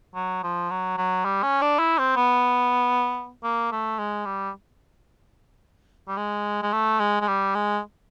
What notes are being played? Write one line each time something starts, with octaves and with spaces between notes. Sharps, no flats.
F#3
F3
F#3
F#3
G3
C#4
D4
E4
C4
B3
A#3
A3
G#3
G3
G3
G#3
G#3
A3
G#3
G#3
G3
G#3